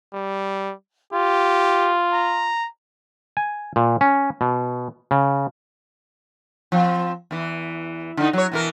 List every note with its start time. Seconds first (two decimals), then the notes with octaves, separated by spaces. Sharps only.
0.14 G3
1.13 F4 G4
2.13 A#5
3.37 G#5
3.76 A#2
4.01 C#4
4.41 B2
5.11 C#3
6.72 F3 C4
7.31 E2 E3
8.17 D3 D#4
8.33 F#3 C#5
8.52 B2 E3 A#4